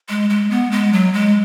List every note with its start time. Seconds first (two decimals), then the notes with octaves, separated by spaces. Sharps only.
0.09 G#3
0.30 G#3
0.50 B3
0.72 G#3
0.93 F#3
1.13 G#3